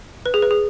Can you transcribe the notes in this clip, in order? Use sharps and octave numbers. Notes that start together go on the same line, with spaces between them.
B4
G#4
B4
G#4